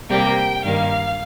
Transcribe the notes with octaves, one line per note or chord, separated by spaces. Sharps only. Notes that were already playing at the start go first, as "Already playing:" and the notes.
C3 G3 A#3 G5
G2 D#3 G3 A#3 F5